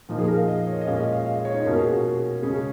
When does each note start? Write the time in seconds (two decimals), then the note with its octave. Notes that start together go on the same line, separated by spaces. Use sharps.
0.09 A#2 F3 A#3 D#4 F4
0.18 G#4
0.28 A#4
0.38 F5
0.48 D#5
0.67 C#5
0.81 D#5
0.87 A#2 G#3 C#4 F5
1.00 D#5
1.12 F5
1.26 F5
1.35 D#5
1.45 C#5
1.54 D#4
1.64 B2 A#3 C#4 F4
1.77 G#4
1.84 F#4
2.04 G#4
2.43 C#3 G#3 C#4 G#4